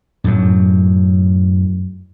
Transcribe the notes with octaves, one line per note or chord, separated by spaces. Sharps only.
F#2 A2 F#3